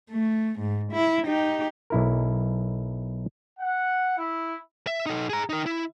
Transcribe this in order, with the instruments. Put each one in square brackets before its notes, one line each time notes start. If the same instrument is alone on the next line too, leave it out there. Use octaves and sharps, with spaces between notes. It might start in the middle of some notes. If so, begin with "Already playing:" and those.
[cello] A3
G#2
E4
D#4 G4
[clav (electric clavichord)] B1 E4 A#4
[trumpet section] F#5
E4
[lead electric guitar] E5
D#4 A4
G#4 A#5
D#4 A#4
E4